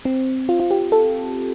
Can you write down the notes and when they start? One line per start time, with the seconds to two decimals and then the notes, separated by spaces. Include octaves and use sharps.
0.05 C4
0.49 F4
0.60 F4
0.71 G4
0.92 A4